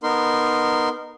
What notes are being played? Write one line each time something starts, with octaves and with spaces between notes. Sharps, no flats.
B3 D#4 A#4 C6